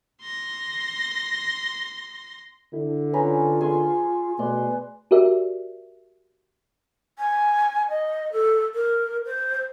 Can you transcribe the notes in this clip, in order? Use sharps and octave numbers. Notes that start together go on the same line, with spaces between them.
C6 A#6
D3 E4
C#4 F4 B4 A#5 B5
G#4 G#5 C6
B2 A3 B4 D5 C6
F#4 G4 A#4 D5 E5
G#5
D#5
A4
A#4
C5